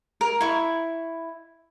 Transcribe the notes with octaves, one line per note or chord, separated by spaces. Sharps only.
A#4
E4 C#6